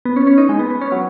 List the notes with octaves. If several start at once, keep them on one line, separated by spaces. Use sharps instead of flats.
B3
C#4
C#4
D#4
G#3
B3
B3
C#4
F#3